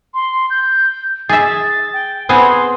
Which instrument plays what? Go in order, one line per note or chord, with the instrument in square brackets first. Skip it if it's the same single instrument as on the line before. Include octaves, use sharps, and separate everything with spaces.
[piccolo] C6
G6
[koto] G#4 E5 [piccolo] A6
[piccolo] G5
[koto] B3 C4 G#4 [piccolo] C6